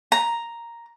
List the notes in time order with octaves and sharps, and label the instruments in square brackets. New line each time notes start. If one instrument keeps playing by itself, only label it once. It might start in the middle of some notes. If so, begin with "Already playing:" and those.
[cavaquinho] A#5